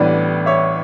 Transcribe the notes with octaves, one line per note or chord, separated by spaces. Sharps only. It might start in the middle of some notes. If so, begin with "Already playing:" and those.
Already playing: A1 A2 G3 B3 D4 B4 D5
C#5 E5